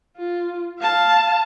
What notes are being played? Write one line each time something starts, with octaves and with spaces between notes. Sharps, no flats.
F4
F5 A5